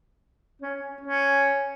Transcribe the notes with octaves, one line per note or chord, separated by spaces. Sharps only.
C#4
C#4